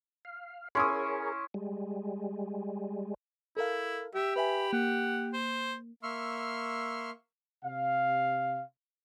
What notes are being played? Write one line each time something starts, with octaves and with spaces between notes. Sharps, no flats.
F5
C#4 E4 G#4 A#4 C#5 C6 D#6
G3 G#3
E4 A4 A#4 F5
G4 E5
B4 E5 G#5 B5
A#3 F#5
C5
A#3 E5 C6 C#6 E6 F6
C3 F5